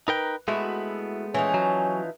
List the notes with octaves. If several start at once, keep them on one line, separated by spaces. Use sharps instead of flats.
D#4 A#4 B4 G5
G#3 A3 B3 E4 F#4
E3 F3 C#4 D#4
F#3